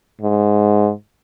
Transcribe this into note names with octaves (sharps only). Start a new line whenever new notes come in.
G#2